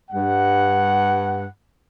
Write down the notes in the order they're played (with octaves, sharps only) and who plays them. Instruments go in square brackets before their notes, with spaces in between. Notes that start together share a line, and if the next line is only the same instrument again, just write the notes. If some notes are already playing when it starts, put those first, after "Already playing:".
[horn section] G2 F#5